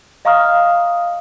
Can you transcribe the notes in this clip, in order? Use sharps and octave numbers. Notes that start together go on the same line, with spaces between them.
D#5 F5 A#5 C#6 D#6 F6